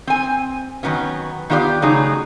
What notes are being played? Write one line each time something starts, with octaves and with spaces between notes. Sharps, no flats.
C4 G#5
D#3 E3 F#3 B3 C#4
D#3 B3 F4 G4 D5
C#3 F#3 A3 D#4 G#4